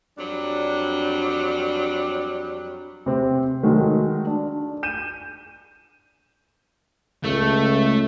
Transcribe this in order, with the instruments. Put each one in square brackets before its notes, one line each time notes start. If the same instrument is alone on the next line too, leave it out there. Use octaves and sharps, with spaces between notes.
[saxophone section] F2 F#3 G3 D4
[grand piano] C3 C4
D#3 F#3 G#3 A3 D#4
D4
G6 D#7 E7
[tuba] C#2 [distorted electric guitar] A3